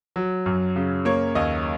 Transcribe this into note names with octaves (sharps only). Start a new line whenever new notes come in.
F#3
F#2
C#3
A#3 C#5
D#2 D#5